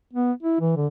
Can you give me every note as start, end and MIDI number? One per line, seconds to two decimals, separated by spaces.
0.13 0.32 59
0.42 0.58 64
0.60 0.74 52
0.76 0.87 50